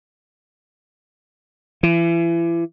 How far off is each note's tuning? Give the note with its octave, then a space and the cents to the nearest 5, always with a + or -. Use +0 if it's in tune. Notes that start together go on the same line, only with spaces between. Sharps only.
E3 +35